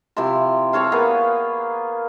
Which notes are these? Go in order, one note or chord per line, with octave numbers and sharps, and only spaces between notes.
C3 F3 E4 C6
C4 A4 C#5 F5
A#3 B3 G#4 B4